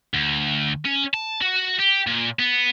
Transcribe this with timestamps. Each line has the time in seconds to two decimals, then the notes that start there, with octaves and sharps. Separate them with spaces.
0.14 D2
0.85 C#4
1.14 A5
1.42 F#4
1.79 G4
2.07 A#2
2.39 B3